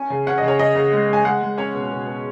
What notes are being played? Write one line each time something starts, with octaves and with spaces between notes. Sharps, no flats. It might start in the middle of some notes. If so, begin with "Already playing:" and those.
Already playing: C#4 G#5
C#3
C#4 F#5
C#3 D#5
C#5
C#3 D#5
C#3
G#3
G#3 G#5
G#3 F#5
G#3
C#4 C#5
B2
B2
B2